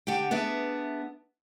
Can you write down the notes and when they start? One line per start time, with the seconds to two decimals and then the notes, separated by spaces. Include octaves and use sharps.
0.07 D3 G4 F#5 G5
0.31 B3 D4 G#4 E5